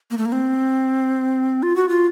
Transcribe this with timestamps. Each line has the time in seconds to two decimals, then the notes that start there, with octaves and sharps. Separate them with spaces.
0.11 A#3
0.18 A3
0.26 A#3
0.32 C4
1.63 F4
1.76 F#4
1.89 F4